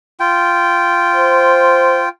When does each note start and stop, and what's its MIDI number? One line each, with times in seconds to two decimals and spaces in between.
0.20 2.09 65
0.20 2.09 79
1.15 2.04 72